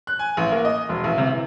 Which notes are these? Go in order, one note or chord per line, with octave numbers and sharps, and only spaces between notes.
F#6
G#5
A1
A#3
D#5
E1
A1
C3
E3